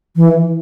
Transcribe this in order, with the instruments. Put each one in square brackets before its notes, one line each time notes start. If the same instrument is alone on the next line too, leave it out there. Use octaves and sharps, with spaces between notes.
[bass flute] E3